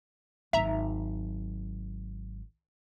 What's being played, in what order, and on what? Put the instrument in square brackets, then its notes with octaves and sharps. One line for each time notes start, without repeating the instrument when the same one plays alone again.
[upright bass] G#1 F#3 [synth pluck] E5 A#5